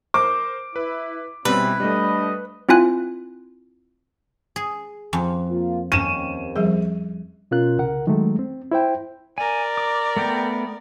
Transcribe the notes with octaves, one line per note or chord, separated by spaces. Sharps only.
A#4 C5 D6
E4 B4
B2 G3 C4 C#4 E4 B4
G3 A3 D4 D#5
C4 E4 F4 G#5 F#6
G#4
F2 G#5
A#3 F4
D#2 C4 C#4 D#7 E7
F3 G3 G#4
B2 C#4 F4 A#4 F#6
C2 C#3 A#4 F#5
D#3 F#3 G#3 A3
C4
E4 C5 G5
A#4 D5 G#5
D6
A3 B3 G5